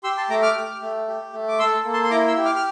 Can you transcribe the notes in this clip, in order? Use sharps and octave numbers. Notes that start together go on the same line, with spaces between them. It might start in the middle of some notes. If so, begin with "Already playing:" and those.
G4 C6 E6
A5 C6
A3 A#5 D6
D6 F6
G4
A3
G4
A3
D6
A4 C6 E6
A#3
A5 C6
C6
E4 A#5 D6
C6 E6
G4
D6 F6
F6